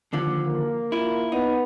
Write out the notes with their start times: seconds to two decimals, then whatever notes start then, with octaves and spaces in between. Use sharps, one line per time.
0.13 D#2 D3 F3
0.44 A#3
0.92 E4 F4
1.32 B3 D#4